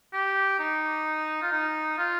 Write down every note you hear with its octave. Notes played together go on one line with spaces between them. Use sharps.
G4
D#4
F4
D#4
F4